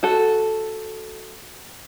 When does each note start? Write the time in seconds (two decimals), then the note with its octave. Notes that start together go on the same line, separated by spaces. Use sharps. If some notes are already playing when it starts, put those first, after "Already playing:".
0.03 F#4 A4